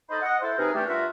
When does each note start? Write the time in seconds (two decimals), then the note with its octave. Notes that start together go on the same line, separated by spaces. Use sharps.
0.10 D#4 A4 C5 D#5 B5
0.22 D#5 F#5
0.41 E4 A4 C5
0.57 C3 D#4 G#4 A#4 B4
0.74 E3 A3 C#4 D4 G4
0.87 G2 F4 F#4 A#4 E5